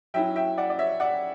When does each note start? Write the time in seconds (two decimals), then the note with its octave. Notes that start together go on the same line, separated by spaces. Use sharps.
0.14 F#3 C#4 E4 E5 G5
0.36 E5 G5
0.58 D5 F#5
0.70 D5
0.79 C#5 E5
1.00 D5 F#5